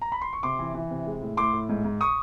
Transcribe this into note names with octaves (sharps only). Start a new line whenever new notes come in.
A#5
B5
C6
C#6
C3 C6 D6
E3
E3
C3
G#3
A2
A2 C6 D6
A2
G#2
G#2
C#6 D#6